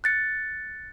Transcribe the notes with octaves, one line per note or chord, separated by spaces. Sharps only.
F#6 A6 C#7